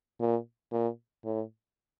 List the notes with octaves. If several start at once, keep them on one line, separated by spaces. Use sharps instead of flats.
A#2
A#2
A2